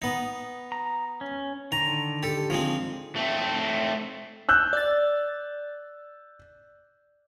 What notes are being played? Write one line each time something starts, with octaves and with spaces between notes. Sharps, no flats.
B3 D#4
A#5
C#4
D3 D#3 A#5
G4 A4
F3 G#3 C4
A3 C4
E6 F#6 G6
D5 A6